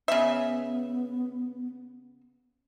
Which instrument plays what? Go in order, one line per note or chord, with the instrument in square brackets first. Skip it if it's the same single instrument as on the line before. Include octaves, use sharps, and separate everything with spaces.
[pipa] C#3 E5 [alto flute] B3